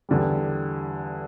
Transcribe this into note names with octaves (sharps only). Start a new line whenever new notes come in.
E2 D3 G3